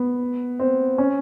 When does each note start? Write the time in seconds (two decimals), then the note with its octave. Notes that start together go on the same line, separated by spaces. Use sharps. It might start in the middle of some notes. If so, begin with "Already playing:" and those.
Already playing: B3
0.59 C4
0.98 C#4